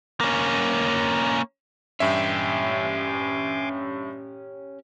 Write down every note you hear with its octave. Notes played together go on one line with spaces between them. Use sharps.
A#3 C#4
G2 C#4 G4 E5 G#5 C6 D6